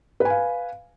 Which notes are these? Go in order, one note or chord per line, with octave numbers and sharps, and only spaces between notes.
B4 F5 G#5